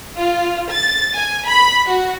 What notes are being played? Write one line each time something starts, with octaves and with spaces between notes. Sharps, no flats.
F4
A6
G#5
B5
F#4